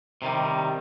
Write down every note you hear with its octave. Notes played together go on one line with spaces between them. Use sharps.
C3 D#3 G3